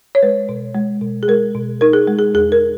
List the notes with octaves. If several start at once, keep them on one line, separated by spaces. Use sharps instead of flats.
C#5
G#3 B4
B2
G#3
B2
G#4
G#3 A#4
B2
D#4 A#4
G#4
G#3
G#4
E2 G#4
A#4